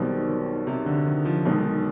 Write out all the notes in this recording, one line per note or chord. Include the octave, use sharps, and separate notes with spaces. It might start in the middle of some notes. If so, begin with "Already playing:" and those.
Already playing: B1 B2 D#3 G3 C4
D#3
C3
D3
D#3
F3
B1 B2 D#3 G#3